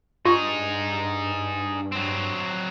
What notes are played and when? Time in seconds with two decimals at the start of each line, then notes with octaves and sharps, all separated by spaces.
0.25 G2 D#4 F4 G#4 C#6
1.92 F#3 C4